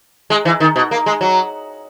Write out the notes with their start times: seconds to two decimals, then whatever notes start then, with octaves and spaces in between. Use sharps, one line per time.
0.30 G#3
0.45 E3
0.60 D#3
0.76 B2
0.91 A#3
1.06 G#3
1.21 F#3